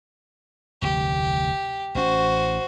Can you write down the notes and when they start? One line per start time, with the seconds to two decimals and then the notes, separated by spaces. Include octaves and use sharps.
0.82 F1 D2 G4
1.95 A1 C#4 F#4 C5